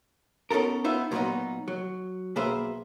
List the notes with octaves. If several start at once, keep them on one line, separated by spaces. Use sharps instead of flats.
B3 C#4 D#4 A4 A#4
B3 D#4 F4 E5
A#2 F#3 G#3 B3 D#4
F#3
B1 A#3 G#4 B4 C5 E5